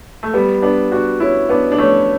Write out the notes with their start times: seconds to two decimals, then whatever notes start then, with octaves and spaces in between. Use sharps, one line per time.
0.23 A3
0.33 G3 B3
0.62 B3 D4
0.91 D4 F#4
1.20 C#4 E4
1.49 B3 D4
1.72 D4
1.78 A3 C#4